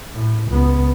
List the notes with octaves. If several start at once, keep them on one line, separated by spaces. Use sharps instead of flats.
A2
C#2 B3